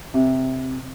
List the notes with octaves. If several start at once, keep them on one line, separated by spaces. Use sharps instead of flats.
C3